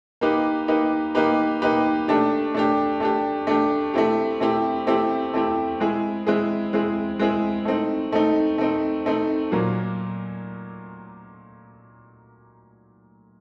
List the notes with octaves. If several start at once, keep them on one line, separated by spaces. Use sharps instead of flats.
A#3 D#4 G4 B4
A#3 D#4 G4 B4
A#3 D#4 G4 B4
A#3 D#4 G4 B4
A3 D4 G4
A3 D4 G4
A3 D4 G4
A3 D4 G4
A3 C4 E4 G4
A3 C4 E4 G4
A3 C4 E4 G4
A3 C4 E4 G4
G#3 C4 E4 G#4
G#3 C4 E4 G#4
G#3 C4 E4 G#4
G#3 C4 E4 G#4
A3 C4 D#4
A3 C4 D#4
A3 C4 D#4
A3 C4 D#4
A#2 F#3 A#3